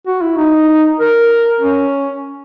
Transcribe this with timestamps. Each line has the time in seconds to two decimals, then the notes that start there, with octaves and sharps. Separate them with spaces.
0.07 F#4
0.22 E4
0.37 D#4
1.00 A#4
1.60 C#4